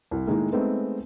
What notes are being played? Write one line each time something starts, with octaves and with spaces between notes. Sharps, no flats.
C2
A2 D#3 G#3 A#3
G#3 A3 B3 C4 D#4